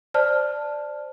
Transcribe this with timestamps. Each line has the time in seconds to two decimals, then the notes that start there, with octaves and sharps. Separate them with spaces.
0.14 C5 D5 A5 F6